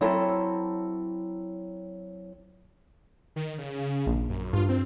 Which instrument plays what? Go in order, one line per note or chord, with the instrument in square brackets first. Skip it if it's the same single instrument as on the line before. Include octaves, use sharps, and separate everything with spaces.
[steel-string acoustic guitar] F#3 C4 E4 A4 A5
[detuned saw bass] D#3
C#3
[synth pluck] A#1
[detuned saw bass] F#2
[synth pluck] G2 [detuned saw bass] F4
[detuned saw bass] C4